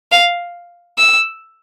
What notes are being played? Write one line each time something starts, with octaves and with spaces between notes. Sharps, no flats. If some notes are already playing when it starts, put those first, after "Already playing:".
F5
E6